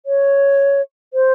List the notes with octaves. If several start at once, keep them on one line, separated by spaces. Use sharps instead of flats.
C#5
C5